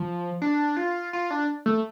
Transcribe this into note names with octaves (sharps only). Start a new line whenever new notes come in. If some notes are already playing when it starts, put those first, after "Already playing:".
Already playing: F3
D4
F4
F4
D4
A3